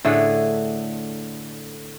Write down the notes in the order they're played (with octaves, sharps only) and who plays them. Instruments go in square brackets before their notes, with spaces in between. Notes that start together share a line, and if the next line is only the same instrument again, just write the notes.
[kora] A2 D3 A3 G#4